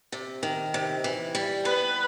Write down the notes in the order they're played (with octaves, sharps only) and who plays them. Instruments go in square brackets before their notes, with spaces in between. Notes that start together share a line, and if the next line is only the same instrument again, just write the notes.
[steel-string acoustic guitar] C3
D#3
C3
E3
G3
[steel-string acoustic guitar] B3 [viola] B4